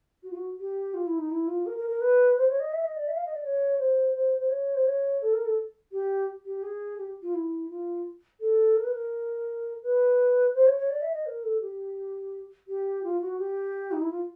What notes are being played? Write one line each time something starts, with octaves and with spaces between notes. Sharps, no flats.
F#4
F4
F#4
G4
F4
E4
D#4
E4
F4
A#4
A#4
A#4
B4
C5
C#5
D#5
E5
D#5
D5
E5
F5
D#5
D5
C#5
C5
C5
C5
C#5
C5
C#5
A4
A#4
A4
G4
G4
G#4
G4
F4
E4
F4
A4
A#4
B4
A#4
B4
C5
C#5
C#5
D5
E5
D#5
A#4
A4
G4
G4
F4
F#4
G4
D#4
E4
F4